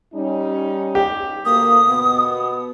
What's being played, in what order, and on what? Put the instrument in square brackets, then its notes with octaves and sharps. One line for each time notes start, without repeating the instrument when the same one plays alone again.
[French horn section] G3 C#4 D#4
[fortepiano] G4
[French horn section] D2 A#3 [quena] D#6
[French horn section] B2 B3